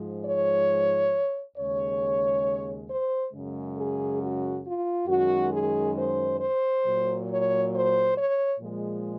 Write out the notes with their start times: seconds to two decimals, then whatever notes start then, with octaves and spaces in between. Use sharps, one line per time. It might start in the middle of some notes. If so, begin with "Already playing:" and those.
Already playing: G#2 F3 G#3
0.24 C#5
1.56 D#2 C#3 G#3 C#5
2.88 C5
3.32 F#2 C#3 G#3
3.76 G#4
4.20 F#4
4.64 F4
5.07 F#2 D#3 G#3 F#4
5.51 G#4
5.96 C5
6.39 C5
6.84 A#2 F#3
7.28 C#5
7.72 C5
8.15 C#5
8.59 A#2 F3 G#3